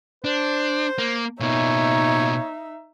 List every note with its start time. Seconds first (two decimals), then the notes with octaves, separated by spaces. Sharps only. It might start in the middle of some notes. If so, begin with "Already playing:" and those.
0.24 D4 C5
0.98 A#3
1.40 B2 A#3 D#4 C#5 E5